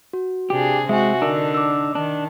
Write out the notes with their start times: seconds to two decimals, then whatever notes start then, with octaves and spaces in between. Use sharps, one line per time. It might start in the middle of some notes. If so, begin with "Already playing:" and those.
0.13 F#4
0.50 C3 D4 G4 G#4
0.89 G#3 C4 F#4 E5 G#5
1.22 D3 D4 D#4 A#4 E6
1.54 D6 E6
1.95 D#3 D4 A5